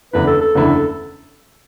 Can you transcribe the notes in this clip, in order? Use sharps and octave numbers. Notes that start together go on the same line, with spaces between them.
F#1 E2 D3 A3 E4 B4
A4
A4
F#1 E2 D3 A3 E4